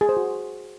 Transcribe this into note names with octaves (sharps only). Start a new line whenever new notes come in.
G#4
C5
F#4